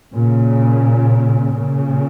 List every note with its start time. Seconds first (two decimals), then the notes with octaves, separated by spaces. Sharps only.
0.13 A#2 C#3
1.54 A#2 C#3